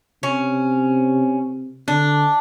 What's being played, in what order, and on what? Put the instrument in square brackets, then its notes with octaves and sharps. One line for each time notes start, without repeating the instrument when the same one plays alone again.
[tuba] C3 [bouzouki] C#4
[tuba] D3 [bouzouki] D4